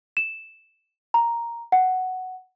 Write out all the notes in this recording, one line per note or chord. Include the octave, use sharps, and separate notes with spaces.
E7
A#5
F#5